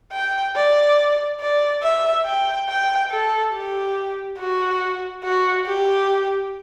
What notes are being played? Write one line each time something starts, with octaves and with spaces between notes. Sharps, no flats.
G5
D5
D5
E5
G5
G5
A4
G4
F#4
F#4
G4